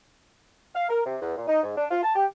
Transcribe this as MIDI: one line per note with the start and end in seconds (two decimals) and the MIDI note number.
0.75 0.86 77
0.89 1.01 70
1.06 1.15 48
1.21 1.34 40
1.36 1.46 46
1.47 1.60 63
1.63 1.73 44
1.76 1.85 62
1.91 2.02 65
2.03 2.15 81
2.15 2.25 67